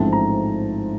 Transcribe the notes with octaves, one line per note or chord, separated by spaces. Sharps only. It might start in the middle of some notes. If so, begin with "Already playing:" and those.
Already playing: A1 G#2 F3 A3 C4 A5
A#5